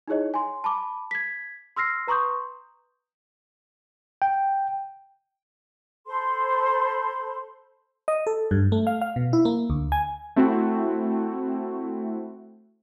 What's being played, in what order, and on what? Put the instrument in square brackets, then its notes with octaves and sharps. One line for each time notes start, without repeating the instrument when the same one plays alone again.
[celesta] D#4 E4 G#4 C#5 D#5
G#5 C6
A5 B5 D6
G#6 B6
C6 E6 F6 A#6 C7
B4 A#5 C6 C#6 D#6 G6
[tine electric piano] G5
[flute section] A4 C5 B5 C6
[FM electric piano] D#5
A4
G2
A3
F5
F5
B2
E4
A#3
D2
G#5
[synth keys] A3 C4 E4 F#4